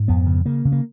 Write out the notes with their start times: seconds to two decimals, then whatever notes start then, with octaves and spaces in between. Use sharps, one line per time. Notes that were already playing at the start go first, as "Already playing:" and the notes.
Already playing: G#2
0.08 F2 B3
0.26 C#3
0.46 C#3 A#3
0.65 C#3
0.72 A#3